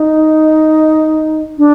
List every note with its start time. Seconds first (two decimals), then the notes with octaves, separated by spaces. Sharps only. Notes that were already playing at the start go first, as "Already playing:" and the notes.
Already playing: D#4
1.58 D4